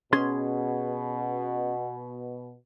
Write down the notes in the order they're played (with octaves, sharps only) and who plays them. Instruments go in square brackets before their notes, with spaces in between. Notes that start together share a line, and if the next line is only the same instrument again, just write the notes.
[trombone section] B2 [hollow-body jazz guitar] C#4 G#4 C6